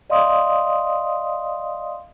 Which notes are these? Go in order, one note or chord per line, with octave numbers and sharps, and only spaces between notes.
D5 D#5 F5 C6 D#6